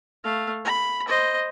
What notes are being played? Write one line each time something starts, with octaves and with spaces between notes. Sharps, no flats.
A3 F5
B5
C5 D#5